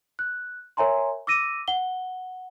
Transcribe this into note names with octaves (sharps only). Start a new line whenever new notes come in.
F#6
A#4 C#5 E5 G#5 A#5 C6
D6 E6 A#6 D#7
F#5 G7